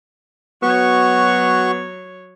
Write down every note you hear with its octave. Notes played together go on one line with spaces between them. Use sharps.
F#3 B3 F#4 C#5 C#6